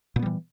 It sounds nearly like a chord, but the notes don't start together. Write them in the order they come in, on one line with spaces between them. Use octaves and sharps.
A#2 B3 G3 E3